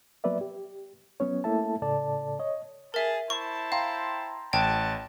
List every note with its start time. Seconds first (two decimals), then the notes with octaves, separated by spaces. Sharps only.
0.24 F#3 A#3 B3 B4 D5 E5
0.41 G4
1.20 F#3 B3 C#4 C#5
1.44 A3 A#3 E4 A4 E5 A5
1.82 A2 C#3 A4 D5 A5
2.39 C#5 D#5
2.94 G#4 A#4 E5 A5
3.30 E4 C5 A5 C#6
3.72 F5 G5 A#5 C6
4.53 A1 F#5 G5 A5